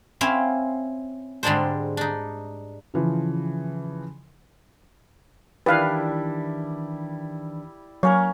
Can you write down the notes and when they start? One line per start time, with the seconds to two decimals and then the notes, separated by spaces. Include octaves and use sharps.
0.21 C4 C#4 E4 C5 F5 B5
1.43 G#2 D3 G3 G#3 D4 C5
1.97 D4 D#4
2.94 C#3 E3 F3
5.66 D#3 E3 G3 D4 E4 B4 F5
8.03 F#3 A#3 C#4 A#4 C#5